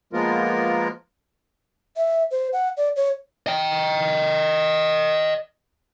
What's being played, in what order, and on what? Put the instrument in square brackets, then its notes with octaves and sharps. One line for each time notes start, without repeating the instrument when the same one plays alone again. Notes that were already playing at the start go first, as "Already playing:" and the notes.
[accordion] F3 G#3 A#3 B3 F4 A#4
[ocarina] E5
C5
F#5
D5
C#5
[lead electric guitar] D#5 G5